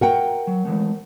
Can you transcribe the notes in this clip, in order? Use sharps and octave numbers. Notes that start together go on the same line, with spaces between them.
F#4 A#4 F#5 G5 A#5
F#3
E3 G#3 A3